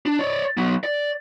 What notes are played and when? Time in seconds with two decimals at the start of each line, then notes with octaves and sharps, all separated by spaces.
0.06 D4
0.19 C#5 D5
0.57 F#3 B3
0.84 D5